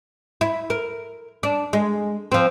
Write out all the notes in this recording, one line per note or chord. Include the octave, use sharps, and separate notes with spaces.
E4
A#4
D4
G#3
F3 C4